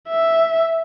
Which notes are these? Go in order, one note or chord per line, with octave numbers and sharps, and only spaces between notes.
E5